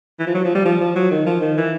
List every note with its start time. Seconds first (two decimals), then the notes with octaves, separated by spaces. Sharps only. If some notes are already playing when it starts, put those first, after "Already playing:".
0.20 E3
0.27 F3
0.35 F#3
0.45 F3
0.55 G3
0.65 F3
0.80 F3
0.96 F#3
1.11 D#3
1.26 F3
1.41 D#3
1.57 E3